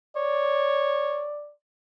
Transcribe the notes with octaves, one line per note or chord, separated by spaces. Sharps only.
C#5 D5